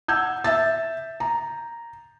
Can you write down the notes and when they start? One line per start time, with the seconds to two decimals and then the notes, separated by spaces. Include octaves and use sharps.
0.08 F#5 E6 G6 G#6
0.44 E5 E6 A6
1.20 A#5